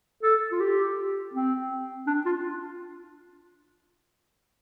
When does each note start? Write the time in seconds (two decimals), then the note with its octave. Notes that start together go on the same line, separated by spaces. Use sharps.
0.23 A4
0.52 F4
0.60 G4
1.34 C4
2.07 D4
2.26 F4